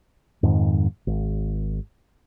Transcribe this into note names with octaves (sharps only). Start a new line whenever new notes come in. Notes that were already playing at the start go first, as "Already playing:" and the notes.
F2 G#2 D#3
G#1